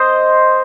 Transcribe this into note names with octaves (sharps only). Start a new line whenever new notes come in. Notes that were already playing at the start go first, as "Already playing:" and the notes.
Already playing: C5 D#5